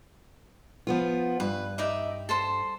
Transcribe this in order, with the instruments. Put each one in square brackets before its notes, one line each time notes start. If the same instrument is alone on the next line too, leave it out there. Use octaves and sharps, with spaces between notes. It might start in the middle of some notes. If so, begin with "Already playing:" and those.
[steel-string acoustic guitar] F3 B3 F4
[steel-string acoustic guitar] G2 [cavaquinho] B4
[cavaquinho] D#4 D5 E5
A4 C5 C6